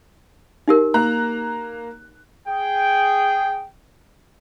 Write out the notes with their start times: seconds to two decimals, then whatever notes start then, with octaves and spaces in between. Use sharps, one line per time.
0.68 D#4 G4 A#4
0.94 A#3 A#5 F#6
2.47 G#4 G5